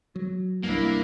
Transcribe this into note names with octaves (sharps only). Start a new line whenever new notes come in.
F#3
C2 G2 A#3 D4 E4